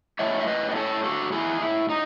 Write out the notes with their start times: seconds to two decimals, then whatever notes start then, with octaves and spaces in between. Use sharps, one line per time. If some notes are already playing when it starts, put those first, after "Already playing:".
0.19 A2 G#3 C#4 C#5 E5
0.40 E5
0.47 B4 D#5
0.71 D#5
0.76 A4 C#5
1.04 F#4 A4
1.32 E4 G#4
1.61 E4
1.89 D#4